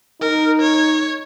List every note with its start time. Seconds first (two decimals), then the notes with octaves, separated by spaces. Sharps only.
0.21 D#4 A#4
0.61 C#5